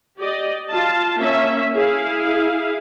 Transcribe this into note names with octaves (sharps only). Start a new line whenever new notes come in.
G4 D5 D#5
F4 A5
A#3 C#4 E5
E4 G#4 F5